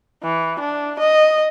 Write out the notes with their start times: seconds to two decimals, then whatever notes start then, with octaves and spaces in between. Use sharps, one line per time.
0.23 E3
0.59 D4
0.99 D#5